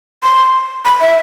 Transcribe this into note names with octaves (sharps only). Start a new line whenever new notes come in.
C6
B5
E5